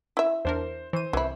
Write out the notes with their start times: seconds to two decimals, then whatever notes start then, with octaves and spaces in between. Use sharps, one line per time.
0.17 E4 E5
0.45 E2 D4 A#4 C5
0.93 E3 C5 D#7
1.13 C2 E3 E4